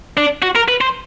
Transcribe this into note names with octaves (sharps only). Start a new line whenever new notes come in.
D4
F#4
A#4
B4
C5